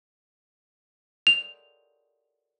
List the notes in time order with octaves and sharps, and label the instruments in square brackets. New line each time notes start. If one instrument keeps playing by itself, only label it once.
[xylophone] F7